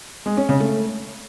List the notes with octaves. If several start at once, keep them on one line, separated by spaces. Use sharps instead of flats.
G#3
C#4
C#3
A3